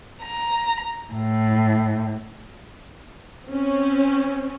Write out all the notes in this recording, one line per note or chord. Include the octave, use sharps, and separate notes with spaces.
A#5
A2
C4 C#4